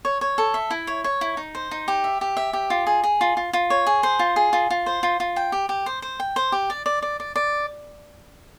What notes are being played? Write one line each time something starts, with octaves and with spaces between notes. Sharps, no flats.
C#5
C#5
A4
E5
E4
C#5
C#5
E4
D#4
C5
D#4
G4
E5
G4
E5
G4
F4
G#4
G#4
F4
F4
F4
C#5
G#4
C5
F4
G#4
F4
F4
C5
F4
F4
G5
G4
G4
C5
C5
G5
C5
G4
D5
D5
D5
D5
D5